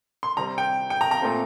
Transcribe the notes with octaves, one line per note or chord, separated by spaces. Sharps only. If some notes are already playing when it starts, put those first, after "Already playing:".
C6
C3 G3 C4 A#5
G5
G5
A#5
A#5
A#2 A3 C4